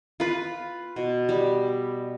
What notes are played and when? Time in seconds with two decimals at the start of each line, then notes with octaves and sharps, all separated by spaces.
0.20 F4 B4
0.96 B2
1.29 G3